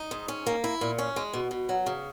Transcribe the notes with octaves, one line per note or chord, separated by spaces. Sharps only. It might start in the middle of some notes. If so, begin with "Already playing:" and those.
Already playing: D#4
G#2
C#4
A#3
E4
A#2
C#4
G#3
B2
B2
F#3
C#3